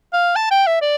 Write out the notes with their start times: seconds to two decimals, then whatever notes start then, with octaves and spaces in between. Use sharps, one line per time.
0.13 F5
0.36 A5
0.51 G5
0.67 E5
0.81 D5